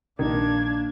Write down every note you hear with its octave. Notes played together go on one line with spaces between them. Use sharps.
A#1 D#3 A#3 D4 G#6